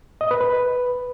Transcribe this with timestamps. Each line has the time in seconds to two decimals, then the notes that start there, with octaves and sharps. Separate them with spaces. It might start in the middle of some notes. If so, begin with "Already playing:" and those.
0.21 D#5
0.31 B4
0.41 B4